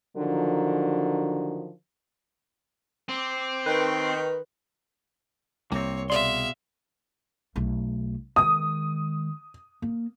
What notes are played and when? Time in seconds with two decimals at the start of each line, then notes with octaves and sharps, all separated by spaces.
0.16 D3 D#3 F3 F#3
3.09 C4 D6
3.66 D#3 B4 G5 C6 C#6
5.72 C2 A#3 C4 C#5
6.10 B2 G#4 D5 E5 F5 C6 F#7
7.56 B1 A3
8.36 D#3 G#3 D#6
9.82 A#3